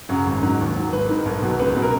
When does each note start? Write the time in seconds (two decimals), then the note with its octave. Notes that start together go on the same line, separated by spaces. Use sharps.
0.09 F#2 C#3 F#3
0.26 G#1
0.42 G#2 F#3
0.60 D#2
0.76 D#3 F#3
0.92 G#1 B4
1.09 G#2 D#3
1.26 B1
1.42 B2 F#3
1.59 C#2 B4
1.76 B2 F#3
1.82 A#4